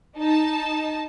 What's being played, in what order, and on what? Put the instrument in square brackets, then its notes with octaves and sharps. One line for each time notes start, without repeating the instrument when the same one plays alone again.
[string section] D#4 A5